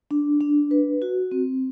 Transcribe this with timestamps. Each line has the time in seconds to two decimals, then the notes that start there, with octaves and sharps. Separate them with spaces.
0.11 D4
0.41 D4
0.71 B4
1.02 F#4
1.31 C4